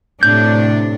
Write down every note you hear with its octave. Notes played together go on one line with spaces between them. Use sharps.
A2 C3 D4 G6